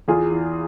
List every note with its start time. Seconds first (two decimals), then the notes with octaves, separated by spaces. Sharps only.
0.08 E2 F4 G#4
0.31 E3